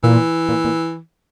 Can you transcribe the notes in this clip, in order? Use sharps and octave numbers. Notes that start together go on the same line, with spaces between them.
A#2 E3
A#2
A#2